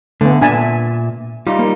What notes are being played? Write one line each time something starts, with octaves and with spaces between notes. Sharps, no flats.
D3 A3 B3
A#2 D4 E5 G#5 A5
G3 D#4 F4
A#3